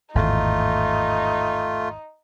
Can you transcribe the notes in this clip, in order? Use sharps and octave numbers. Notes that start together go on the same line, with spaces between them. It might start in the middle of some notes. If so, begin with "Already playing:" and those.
G#1 E2 A2 A3 D#4 F4